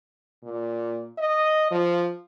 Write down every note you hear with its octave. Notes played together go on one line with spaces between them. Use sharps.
A#2
D#5
F3